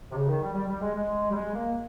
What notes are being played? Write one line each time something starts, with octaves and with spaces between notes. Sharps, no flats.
C3
C#3
D#3
G3
G3
G3
G#3
G#3
G3
G#3
A#3